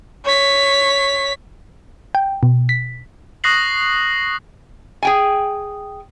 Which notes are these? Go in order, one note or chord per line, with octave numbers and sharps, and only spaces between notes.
C#5 B6
G5
B2
B6
C#6 D#6 F#6 A#6 C7 F#7
G#4 G5 G#5